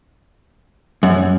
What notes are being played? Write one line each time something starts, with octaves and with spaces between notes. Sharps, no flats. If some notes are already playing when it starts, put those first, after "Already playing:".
F#2